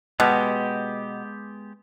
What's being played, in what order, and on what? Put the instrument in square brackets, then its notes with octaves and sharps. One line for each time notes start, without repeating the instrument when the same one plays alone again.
[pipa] B2 [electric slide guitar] G#3 B3 G4